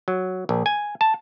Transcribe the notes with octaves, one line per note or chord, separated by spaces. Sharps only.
F#3
A#1
G#5
A5